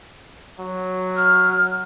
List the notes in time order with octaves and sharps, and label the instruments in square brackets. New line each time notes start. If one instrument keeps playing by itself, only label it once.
[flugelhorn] F#3
[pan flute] F6